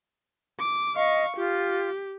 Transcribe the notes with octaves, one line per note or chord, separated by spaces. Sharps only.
D6
D#5 F5 C#6
F4 G4